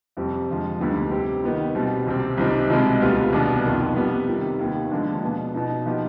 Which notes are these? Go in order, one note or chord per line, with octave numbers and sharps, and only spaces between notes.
F2 C3 G3 C4
F2 D3 F3 G#3
D2 D3 G3 B3 D#4
C3 G3 C4 G4
D#3 B3 D#4
B2 G3 C4
C2 C3 G3 C4
C2 C3 G3 C4 D#4
C2 B2 G#3 C4
D2 C3 G3 B3 F4
C2 B2 B3 D4
F2 D#3 B3 F4
C3 G3 B3
C3 D#3 G3
D#2 D#3 B3
D#2 D3 F3 G#3 D4
B2 B3 D4
B2 B3 D#4
F3 B3 D#4 G4